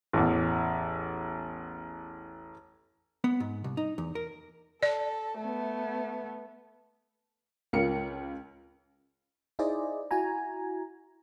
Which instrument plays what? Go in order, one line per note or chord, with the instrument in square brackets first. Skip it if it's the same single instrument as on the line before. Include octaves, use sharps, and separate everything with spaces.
[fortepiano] A1 E2
[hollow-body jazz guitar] B3
G#2
C2
D#4
E2
A#4
[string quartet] A4 [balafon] D5
[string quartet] A3 B3
[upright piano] C#2 F4 A#4 C#7
[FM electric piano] D#4 E4 G#4 C5 D5 D#5
E4 F#4 G#5 A#5